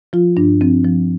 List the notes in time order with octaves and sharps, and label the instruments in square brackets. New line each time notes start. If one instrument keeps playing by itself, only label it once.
[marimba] F3 F4
G2 D4
F3 C4
F3